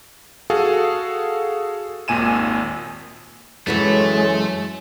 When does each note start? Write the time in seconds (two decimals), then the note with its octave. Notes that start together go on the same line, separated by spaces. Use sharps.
0.50 F#4 G#4 A4 F5
2.08 G#1 D#2 A#2 G#5 D#7 E7
3.67 F#2 A2 E3 F#3 G#3 A3